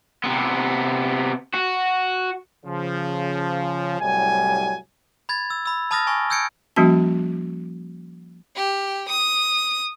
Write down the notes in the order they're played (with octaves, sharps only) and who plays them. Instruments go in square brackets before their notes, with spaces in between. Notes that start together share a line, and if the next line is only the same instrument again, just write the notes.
[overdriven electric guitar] C3 B3
F#4
[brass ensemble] C#3 F3
C2 A2 F#3 G3 G#5
[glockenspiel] B5 G#6 A6
E6
B5 E6
A5 B5 D#6 F6 A6 A#6
G#5 C#6 A#6
E6 G6 G#6 C#7 D7
[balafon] F3 G3 A#3 C#4 F#4 A5
[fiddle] G4
D#6